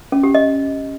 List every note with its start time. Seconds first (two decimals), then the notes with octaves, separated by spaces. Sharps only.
0.12 C#4
0.23 G4
0.35 D#5